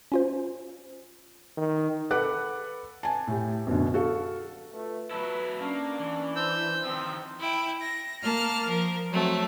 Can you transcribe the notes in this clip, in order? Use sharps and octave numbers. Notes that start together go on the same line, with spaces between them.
C#4 F4 C5
D#3
A4 B4 F#5 B5 D6 F#6
G#5 A5
A2 G4
F#2 B2 D3
F#4 A4 F5
A3 F4 B4
F#3 E4 B4 A5
A#3 C#4 D4 A5 C#6
E3
C5 C6 E6 G6
D#3 F3 C4
E4 G5
A#6
A#3 A5 F6
F3 A#4
F#3 A3 C4